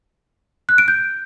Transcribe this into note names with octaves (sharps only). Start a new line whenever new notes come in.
F#6
D7
G6